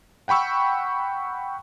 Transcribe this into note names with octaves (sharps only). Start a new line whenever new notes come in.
F#5 G5 B5 C#6 E6